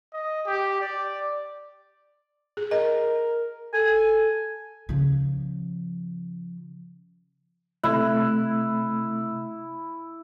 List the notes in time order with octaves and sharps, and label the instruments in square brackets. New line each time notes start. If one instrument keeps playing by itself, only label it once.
[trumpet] D#5
G4
D5
[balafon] G#4
[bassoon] A#4 [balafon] D#5
[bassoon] A4 [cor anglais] G#5
[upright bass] C#3 F3
[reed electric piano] C3 A3 F#6 [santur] E4